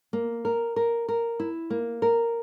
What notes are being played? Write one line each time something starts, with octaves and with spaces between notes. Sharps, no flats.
A#3
A#4
A#4
A#4
E4
A#3
A#4